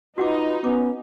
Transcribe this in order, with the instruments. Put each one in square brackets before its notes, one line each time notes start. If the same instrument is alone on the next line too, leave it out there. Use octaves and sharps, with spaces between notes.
[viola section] D#4 [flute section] F4 B4 [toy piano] F#4 F#5 D6
[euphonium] B3 [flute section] C#4 [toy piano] D6